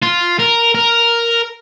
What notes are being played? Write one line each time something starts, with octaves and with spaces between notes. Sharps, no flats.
F4
A#4
A#4